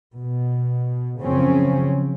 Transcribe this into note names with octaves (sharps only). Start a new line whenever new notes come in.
B2
F#2 C#3 F3 C4 C#4